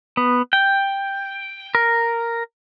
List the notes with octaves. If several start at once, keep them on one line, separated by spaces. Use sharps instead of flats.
B3
G5
A#4